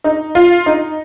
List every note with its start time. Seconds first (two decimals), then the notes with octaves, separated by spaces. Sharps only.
0.04 D#4
0.35 F4
0.66 D#4